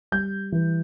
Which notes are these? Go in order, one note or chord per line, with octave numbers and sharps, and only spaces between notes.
G3 G6
E3